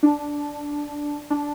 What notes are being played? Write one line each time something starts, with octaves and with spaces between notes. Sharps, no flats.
D4
D4